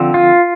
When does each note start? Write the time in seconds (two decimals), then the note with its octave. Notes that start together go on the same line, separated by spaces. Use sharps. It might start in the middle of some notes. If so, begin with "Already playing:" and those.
Already playing: D3 F3 C4
0.14 F4